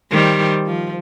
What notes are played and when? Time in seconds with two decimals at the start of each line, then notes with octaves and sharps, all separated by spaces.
0.11 D#3 G3 C5
0.66 F3